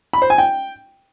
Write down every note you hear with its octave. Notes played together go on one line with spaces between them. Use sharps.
B5
C5
G#5
G5